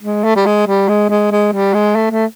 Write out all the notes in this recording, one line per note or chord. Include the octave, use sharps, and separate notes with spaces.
G#3
A3
G3
G#3
G3
G#3
G#3
G#3
G3
G#3
A3
A3